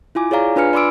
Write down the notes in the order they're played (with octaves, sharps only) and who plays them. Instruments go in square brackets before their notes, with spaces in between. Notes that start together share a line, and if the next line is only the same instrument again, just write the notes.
[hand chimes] E4 F4 G#5 D6
G#4 C#5 D5 F5 A#5
D4 F4 B4 G#5 F6 C#7
D5 B5 C6 D6 E6 D7